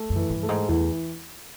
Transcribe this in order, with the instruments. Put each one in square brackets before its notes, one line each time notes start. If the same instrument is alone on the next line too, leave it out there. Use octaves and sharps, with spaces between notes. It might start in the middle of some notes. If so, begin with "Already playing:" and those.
Already playing: [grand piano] A3
[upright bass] F#2
[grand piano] E3
[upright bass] G2
[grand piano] A3
[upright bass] G#2
[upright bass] E2 [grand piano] E3